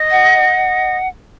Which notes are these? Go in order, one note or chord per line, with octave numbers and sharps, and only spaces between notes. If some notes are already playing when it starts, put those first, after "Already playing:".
Already playing: D#5
F#5